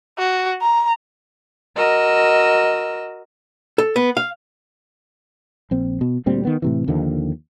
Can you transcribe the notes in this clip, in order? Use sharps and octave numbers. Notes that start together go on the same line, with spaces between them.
F#4
A#5
F#4 A#4 D#5 E6
A4
B3
F5
A#1 C4
B2
D2 A#2 G3 C4
D#3 B3
A2 C3 E3
D#2 D3 D#3 F3